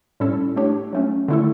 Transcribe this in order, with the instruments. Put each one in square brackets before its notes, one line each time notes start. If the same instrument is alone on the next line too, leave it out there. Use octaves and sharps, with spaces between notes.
[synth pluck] A2 G3 C#4 E4 A4
A3 D4 G4 C#5
F#3 A3 C#4
D3 A3 E4 A4